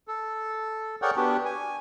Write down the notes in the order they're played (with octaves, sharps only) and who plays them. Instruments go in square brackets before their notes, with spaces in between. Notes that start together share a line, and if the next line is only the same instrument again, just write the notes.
[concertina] A4
G#4 A#4 C#5 D5 F#5 G5
B3 D4 F#4 G4
G#5